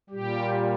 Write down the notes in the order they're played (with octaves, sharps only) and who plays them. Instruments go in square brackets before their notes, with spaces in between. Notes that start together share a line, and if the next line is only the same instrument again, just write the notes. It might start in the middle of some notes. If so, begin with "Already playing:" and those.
[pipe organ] A#2 G3 G4